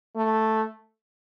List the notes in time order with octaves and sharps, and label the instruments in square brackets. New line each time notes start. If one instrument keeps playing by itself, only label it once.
[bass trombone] A3